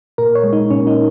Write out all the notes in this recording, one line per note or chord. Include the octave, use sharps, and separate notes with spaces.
A#2 A#4
C#5
G#3
D#4
A#2 C#4
D#4